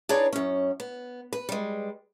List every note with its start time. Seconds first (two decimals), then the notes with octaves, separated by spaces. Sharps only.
0.09 D4 D#4 G#4 B4 C#5 D5
0.33 F#2 C#4
0.80 B3
1.33 B4
1.49 G3 G#3